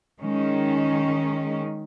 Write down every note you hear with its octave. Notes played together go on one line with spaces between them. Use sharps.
D#3 G#3 C#4